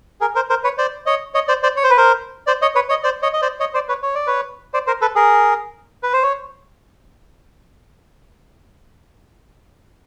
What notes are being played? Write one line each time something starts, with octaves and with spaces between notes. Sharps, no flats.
G#4 A#4
A#4 C5
A#4 C5
B4 C#5
C5 D5
C#5 D#5
C#5 D#5
C5 D5
C5 D5
C#5
C5
B4
A#4 C5
C5 D5
C#5 D#5
B4 C#5
C#5 D#5
C5 D5
C#5 D#5
D#5
C5 D5
C#5 D#5
C5 D5
B4 C#5
C#5
D5
B4 C#5
C5 D5
A#4 C5
A4 B4
G#4 A#4
B4
C5
C#5